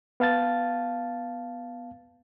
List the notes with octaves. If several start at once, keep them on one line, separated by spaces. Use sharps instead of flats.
B3 F5 A5 A6